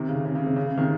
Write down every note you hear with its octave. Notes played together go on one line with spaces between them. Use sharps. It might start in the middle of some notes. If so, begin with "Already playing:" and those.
Already playing: C3 D#3
C#3
C#3
C#3
C3
C#3
C#3
C3 D#3